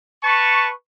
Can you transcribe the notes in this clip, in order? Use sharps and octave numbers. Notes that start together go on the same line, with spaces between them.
B4 A5 C#6